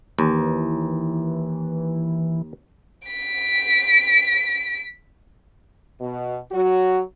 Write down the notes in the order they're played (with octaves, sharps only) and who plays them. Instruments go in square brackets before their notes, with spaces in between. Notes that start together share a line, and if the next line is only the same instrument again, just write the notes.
[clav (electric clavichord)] D#2 [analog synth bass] E3
[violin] B6 D7
[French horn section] B2
F#3 F#4